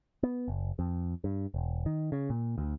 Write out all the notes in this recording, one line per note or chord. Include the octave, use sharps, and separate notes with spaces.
B3
F#1
F2
G2
E1
D#3
C#3
A#2
D2